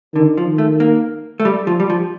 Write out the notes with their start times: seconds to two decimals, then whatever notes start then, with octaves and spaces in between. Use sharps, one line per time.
0.15 D3 D#3
0.37 F3
0.48 D#3
0.58 A3
0.80 A#3
1.40 A3
1.45 G3
1.67 F3
1.80 G3
1.90 F3